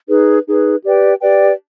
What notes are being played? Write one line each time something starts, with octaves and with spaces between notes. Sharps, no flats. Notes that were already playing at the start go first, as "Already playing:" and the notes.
D#4 G#4 B4
D#4 G#4 B4
G4 B4 D5 G5
G4 B4 D5 G5